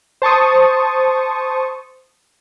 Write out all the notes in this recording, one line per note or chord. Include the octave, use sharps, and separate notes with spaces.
C5 A5 C#6 D#6